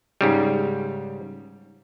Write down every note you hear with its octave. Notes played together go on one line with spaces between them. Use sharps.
G#2 C#3 G3